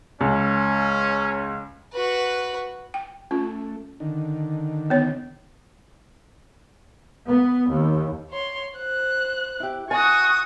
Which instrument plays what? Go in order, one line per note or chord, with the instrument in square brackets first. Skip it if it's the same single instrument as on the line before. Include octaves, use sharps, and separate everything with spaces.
[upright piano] C#2 [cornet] C#4
[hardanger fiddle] F#4 B4
[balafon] G5
[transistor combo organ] A3 [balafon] C#4 F4
[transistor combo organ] D3 D#3
[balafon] B3 C#5
[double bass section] B3
D#2
[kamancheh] C#5 C6
C5 F#6
[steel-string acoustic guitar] E4 G4
[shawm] F#4 [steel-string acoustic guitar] G#5 [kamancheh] C#6 D#6